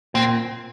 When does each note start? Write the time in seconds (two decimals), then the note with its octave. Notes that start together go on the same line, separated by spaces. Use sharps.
0.14 A#2 C4